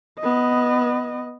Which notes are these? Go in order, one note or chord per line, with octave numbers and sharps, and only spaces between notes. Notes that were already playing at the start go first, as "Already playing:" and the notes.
B3 D#5